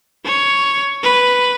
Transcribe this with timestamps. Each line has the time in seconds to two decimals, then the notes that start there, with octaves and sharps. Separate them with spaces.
0.25 C#5
1.03 B4